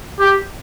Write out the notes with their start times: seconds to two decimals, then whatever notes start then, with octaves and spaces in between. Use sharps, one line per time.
0.20 G4